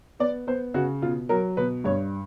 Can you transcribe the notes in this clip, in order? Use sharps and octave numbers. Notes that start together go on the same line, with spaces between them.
B3 D5
B3 C5
C#3 F#4
B2 F4
F#3 A#4
B2 B4
G2 C#5